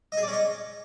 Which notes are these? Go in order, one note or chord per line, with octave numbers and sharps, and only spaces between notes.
D#5
G#4
D5
C#4
D#5